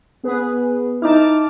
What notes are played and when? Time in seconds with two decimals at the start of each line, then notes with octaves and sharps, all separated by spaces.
0.24 B3 G#4 B4
1.02 D#4 E4 A5 D6 F6